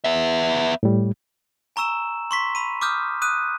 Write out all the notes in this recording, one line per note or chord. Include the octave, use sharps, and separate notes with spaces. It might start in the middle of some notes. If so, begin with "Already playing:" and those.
B3 E5
A2 G3
G#5 A#5 C#6 E6 E7
C6 C#6 B6
B5 D#7
D6 D#6 F6 G6
D#6 F#6 D#7